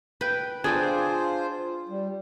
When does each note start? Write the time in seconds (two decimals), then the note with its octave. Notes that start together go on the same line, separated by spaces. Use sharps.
0.21 B4 G5
0.64 D4 F4 G#4 C5 G5 G#5
1.89 G3